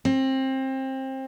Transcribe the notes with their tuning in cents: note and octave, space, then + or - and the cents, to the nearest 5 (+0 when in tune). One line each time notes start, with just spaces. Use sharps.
C4 +25